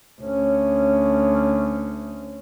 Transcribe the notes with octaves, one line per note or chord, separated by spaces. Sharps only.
D2 C#4